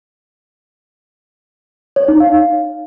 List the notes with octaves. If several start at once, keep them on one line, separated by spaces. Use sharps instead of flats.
C#5
D#4
F5